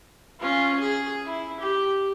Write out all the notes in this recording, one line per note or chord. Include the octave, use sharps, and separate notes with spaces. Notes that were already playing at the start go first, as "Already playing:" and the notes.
C#4 F4
G#4
E4
G4